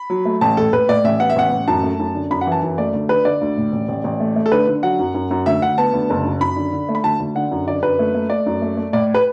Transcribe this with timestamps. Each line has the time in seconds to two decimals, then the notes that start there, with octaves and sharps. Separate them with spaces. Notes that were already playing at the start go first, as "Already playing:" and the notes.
Already playing: B5
0.10 F#3
0.25 A3
0.41 A1 A5
0.57 A2 A4
0.73 A2 B4
0.88 A2 D5
1.04 A1 E5
1.20 B3 F#5
1.30 E5
1.36 A1 F#5
1.52 A1
1.68 F#2 A5
1.83 A3
2.00 F#2
2.15 D3
2.31 F#2 B5
2.41 F#5
2.47 E3 A5
2.63 F#2
2.78 A3 D5
2.93 D2
3.09 D3 B4
3.25 D3 D5
3.41 D2
3.57 A2
3.72 A1
3.88 A1
4.04 A1
4.20 A3
4.36 A3
4.46 A4
4.51 D3 B4
4.68 D3
4.83 F#3 F#5
4.99 F#2
5.14 F#2
5.31 F#2
5.46 D2 E5
5.62 D2 F#5
5.78 B3 A5
5.94 D2
6.10 F#1
6.25 F#2
6.41 F#2 B5
6.56 D3
6.73 D3
6.89 A3
6.95 B5
7.04 D2 A5
7.20 D2
7.35 D3 F#5
7.51 F#2
7.67 D3 D5
7.83 F#2 B4
7.99 A3
8.14 A3
8.30 A3 D5
8.46 F#2
8.62 A3
8.77 A3
8.93 A2 D5
9.14 B4